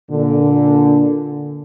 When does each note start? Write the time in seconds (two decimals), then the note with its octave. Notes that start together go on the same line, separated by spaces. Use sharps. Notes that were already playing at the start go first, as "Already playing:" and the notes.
0.11 A#2 D3